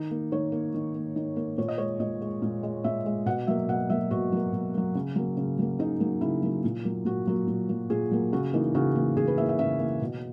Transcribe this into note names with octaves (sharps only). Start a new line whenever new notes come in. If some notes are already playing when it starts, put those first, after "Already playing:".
Already playing: D#3 D#4
A#3
D#3 C#5
A#3
D#3
A#3
D#3
A#3
A#2 C#5
D#5
G#3 C#5
A#2 D#5
G#3
A#2
G#3
A#2 E5
G#3
B2 F#5
F#3 A#3 E5
B2 F#5
F#3 A#3 E5
B2 F#4
F#3 A#3
B2
F#3 A#3
C#3
F#3 A#3
C#3
F#3 A#3
C#3 D#4
F#3 A#3
C#3 E4
F#3 A#3
A#2
F#3 A#3
A#2 F#4
F#3 A#3
A#2
F#3 A#3
A#2 G#4
F#3 A#3
C#3 F#4
E3 A#3 D#4
C#3 F#4
E3 A#3
C#3 G#4
B4
E3 A#3 E5
E5
C#3 E5
E3 A#3
B2